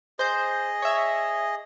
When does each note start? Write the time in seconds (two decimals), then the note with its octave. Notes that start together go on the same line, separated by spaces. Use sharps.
0.19 G#4 C5 D#5 G6
0.82 C#5 E5